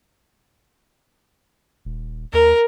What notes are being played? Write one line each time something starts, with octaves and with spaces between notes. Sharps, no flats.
D#1
D#2 A#4